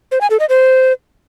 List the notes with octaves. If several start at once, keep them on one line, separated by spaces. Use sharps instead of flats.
C5
G#5
A4
D#5
C5